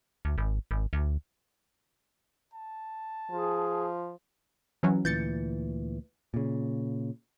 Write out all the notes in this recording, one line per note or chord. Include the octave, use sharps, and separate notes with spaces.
D2
G#1
G#1
D2
A5
F3 G#4
E3 F#3 C#4
D2 A#2 E3 G6 A6 C#7
A#2 C#3